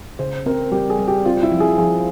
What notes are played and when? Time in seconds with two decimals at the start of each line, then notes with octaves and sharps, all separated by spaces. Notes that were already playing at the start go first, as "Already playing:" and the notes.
0.19 C#3 C5
0.46 C4 A#4
0.72 G3 G4
0.90 G#4
0.99 G3
1.08 G4
1.25 C4 F4
1.43 E4
1.52 F3
1.60 G#4
1.78 F3 G#4